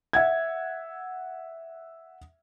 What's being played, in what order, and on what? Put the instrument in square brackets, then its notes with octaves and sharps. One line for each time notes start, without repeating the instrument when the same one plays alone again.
[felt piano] E5 F#5 G#6